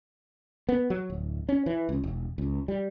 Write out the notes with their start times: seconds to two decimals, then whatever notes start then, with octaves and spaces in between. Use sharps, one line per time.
0.69 B3
0.90 F#3
1.10 D1
1.49 C#4
1.66 E3
1.89 C#2
2.04 E1
2.38 C#2
2.68 G3